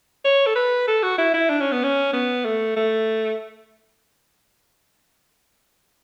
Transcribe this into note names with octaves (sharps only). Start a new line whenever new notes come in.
C#5
A4
B4
A4
F#4
E4
E4
D4
C#4
B3
C#4
B3
A3
A3